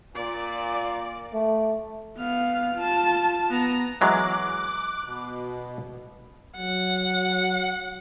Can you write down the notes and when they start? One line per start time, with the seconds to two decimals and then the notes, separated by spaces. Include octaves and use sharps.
0.15 A#2 D5
1.34 A3
2.17 B3 F5
2.75 F4 A5
3.50 B3 A#5
4.01 E3 F#3 G#3 D6 F#6
5.05 B2
6.57 F#3 F#5